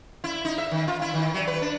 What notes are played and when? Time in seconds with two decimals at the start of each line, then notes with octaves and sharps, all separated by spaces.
0.24 E4
0.45 D#4
0.58 E5
0.71 D#3
0.88 F4
1.02 E4
1.14 D#3
1.34 F#3
1.47 B4
1.61 D4